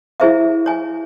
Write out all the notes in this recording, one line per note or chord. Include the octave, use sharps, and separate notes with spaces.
E4 G#4 C5 E5 F5
C#5 G#5